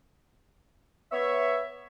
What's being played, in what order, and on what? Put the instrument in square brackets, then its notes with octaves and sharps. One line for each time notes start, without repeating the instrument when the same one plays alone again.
[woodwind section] B3 C#5 E5